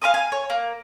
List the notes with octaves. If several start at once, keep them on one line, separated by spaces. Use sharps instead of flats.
F5 G#5 C6 D#6
G#5
C#5
A#3